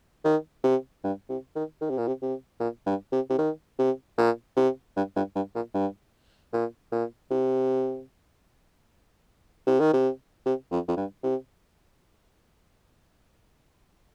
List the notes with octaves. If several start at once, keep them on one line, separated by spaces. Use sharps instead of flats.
D#3
C3
G2
C3
D#3
D#3
C3
A#2
C3
C3
A#2
G2
C3
C3
D#3
C3
A#2
C3
G2
G2
G2
A#2
G2
A#2
A#2
C3
C3
D#3
C3
C3
F2
F2
G2
C3